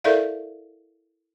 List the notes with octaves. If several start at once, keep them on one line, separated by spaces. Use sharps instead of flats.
E4 A4 A#4 D5 E5 F5